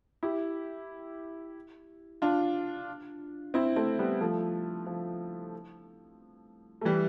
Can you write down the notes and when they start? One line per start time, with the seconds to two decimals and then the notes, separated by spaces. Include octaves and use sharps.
0.23 E4 G4
2.22 D4 F4
3.54 C4 E4
3.76 A3 C4
3.99 G3 B3
4.21 F3 A3
4.87 F3
6.81 A3
6.85 E3 G3